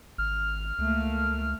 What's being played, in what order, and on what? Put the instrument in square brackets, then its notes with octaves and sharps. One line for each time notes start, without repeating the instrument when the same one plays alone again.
[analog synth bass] G#1 [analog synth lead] F6
[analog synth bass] C#2 [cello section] A3 A#3